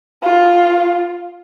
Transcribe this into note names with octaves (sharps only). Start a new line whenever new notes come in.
F4